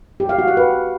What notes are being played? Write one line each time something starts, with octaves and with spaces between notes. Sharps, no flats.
G4
F5
F#4
F#5
B4